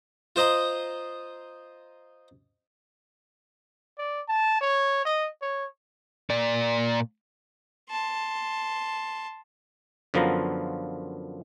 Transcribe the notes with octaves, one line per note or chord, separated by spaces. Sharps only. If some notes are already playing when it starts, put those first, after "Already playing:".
F4 C5 D#5 A#5 D#6
D5
A5
C#5
D#5
C#5
A#2 D5
A5 C6
F#2 D3 F3 B3 F4 A#5